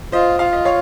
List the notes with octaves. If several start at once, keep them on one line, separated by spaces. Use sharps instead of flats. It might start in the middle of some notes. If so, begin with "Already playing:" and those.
F4 C5 D#5
F4 F5
D#5
C#5 F5